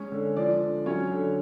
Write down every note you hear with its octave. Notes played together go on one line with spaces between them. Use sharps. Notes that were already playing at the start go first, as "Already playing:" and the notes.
Already playing: G#3 C#4 C#5
D3
F3 D4 D5
D3
F#3 C#4 C#5
D3